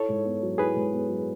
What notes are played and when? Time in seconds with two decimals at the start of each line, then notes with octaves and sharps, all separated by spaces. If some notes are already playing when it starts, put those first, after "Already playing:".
Already playing: E4 A4 C#5
0.09 G#2
0.25 B3
0.42 F#3
0.58 E4 G#4 B4
0.75 G#2
0.93 B3
1.09 F#3